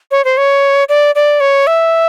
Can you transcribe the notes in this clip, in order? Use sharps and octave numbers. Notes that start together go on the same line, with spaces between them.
C#5
C5
C#5
D5
D5
C#5
E5